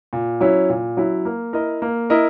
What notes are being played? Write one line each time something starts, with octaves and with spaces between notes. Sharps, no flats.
A#2
F#3 C#4 E4
A#2
F#3 C#4 E4
A#3
E4 A#4 D#5
A#3
E4 A#4 D#5